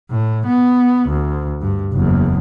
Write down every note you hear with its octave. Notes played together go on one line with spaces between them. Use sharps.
A2
B3
D2
G2
F#1 E2